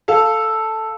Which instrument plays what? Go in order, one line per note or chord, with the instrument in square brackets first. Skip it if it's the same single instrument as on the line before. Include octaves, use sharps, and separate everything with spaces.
[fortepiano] A4 F5